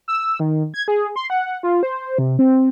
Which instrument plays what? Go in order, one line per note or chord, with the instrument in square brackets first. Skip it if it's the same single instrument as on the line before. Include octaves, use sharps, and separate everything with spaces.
[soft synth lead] E6
D#3
G#6
G#4
C6
F#5
F4
C5
C3
C4